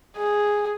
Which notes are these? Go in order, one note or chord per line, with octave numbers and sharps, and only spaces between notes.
G#4